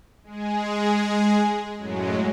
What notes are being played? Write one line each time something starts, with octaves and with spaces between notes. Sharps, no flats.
G#3 G#4
F#2 A2 F#3 G#3